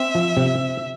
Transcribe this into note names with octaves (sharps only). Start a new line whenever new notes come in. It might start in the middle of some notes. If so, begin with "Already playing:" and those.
Already playing: C4 E5
F3
C3